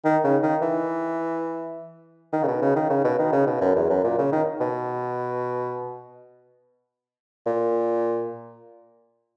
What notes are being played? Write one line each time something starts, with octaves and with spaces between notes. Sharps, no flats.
D#3
C#3
D#3
E3
D#3
C#3
B2
C#3
D#3
C#3
B2
D#3
C#3
B2
F#2
E2
F#2
A#2
C#3
D#3
B2
A#2